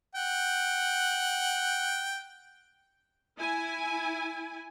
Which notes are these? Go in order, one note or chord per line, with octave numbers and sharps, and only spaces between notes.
F#5 G5
E4 G#5